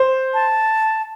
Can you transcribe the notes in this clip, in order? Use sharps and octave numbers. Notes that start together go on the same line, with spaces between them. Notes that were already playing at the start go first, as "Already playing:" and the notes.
Already playing: C5
A5